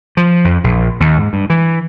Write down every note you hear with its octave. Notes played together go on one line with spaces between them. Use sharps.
F3
F2
A#1
D#2
G#2
G2
E3